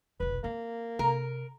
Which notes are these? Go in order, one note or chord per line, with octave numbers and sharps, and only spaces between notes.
F1 B1 B4
A#3 C4
C3 A#4